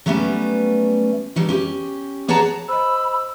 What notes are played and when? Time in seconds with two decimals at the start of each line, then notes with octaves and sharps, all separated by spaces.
0.06 F#3 G3 A3 B3 C#4
1.36 F#3 G3 D4
1.49 C#4 G4
2.28 G#4 C#5 D5 F#5 A5 A#5
2.68 C5 D#5 B5 E6